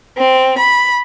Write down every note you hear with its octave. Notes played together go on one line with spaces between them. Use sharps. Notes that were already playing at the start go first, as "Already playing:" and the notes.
C4
B5